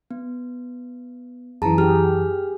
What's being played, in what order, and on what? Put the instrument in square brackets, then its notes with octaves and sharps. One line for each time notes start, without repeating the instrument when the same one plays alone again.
[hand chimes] B3
[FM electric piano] F#2 E3 [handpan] G#4 [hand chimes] A5 A#5
[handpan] G4 G#4 [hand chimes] F6